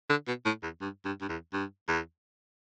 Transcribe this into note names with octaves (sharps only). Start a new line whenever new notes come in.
D3
B2
A2
E2
G2
G2
G2
E2
G2
E2